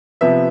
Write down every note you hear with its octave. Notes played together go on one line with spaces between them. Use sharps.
C3 F3 B3 E5